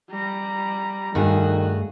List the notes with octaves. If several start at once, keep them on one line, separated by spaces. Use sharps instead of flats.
G3 A#5
G2 D#3 A3 F#4 G#4